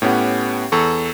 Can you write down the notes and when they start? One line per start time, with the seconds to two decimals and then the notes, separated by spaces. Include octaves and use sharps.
0.02 A2 B3 C#4 G4 F#5
0.72 E2 A4 C#6